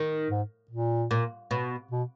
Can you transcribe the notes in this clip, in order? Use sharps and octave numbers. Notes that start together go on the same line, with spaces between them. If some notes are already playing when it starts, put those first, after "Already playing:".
Already playing: D#3
G#2
A#2
A#2
B2
B2